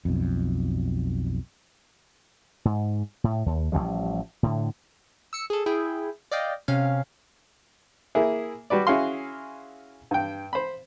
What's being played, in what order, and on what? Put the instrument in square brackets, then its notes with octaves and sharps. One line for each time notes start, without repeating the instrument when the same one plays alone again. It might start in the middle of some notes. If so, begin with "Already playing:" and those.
[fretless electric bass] B1 F2
[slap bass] G#2
A2
D#2
A1 A#2 F3 G3
A2 D3
[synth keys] E6 C#7
G#4 A4
E4 G#4 G5
D5 D#5 F5 G5
C3 C#4 F5
[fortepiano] A#3 E4 G#4
G3 F#4 B4 D5
C#4 E4 F#4 G#4 F5 C6
G2 G5
C5 B5